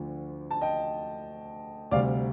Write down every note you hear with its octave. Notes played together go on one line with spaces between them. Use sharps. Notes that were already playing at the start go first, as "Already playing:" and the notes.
Already playing: D2 D3 F3
A5
D#5 G5
D2 C3 G3 D5 F5